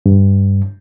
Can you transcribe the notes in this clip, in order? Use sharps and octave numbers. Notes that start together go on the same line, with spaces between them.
G2